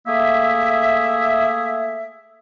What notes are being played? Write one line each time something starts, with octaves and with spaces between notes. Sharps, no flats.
A3 A#3 G#4 E5